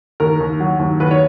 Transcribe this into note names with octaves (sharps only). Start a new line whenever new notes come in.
D#2 A#4
D#2
F#3
D#2
D#2 B4
C#5